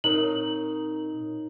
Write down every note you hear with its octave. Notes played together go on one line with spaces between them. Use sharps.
A#2 C4 D#4 A#4 C#5 F#7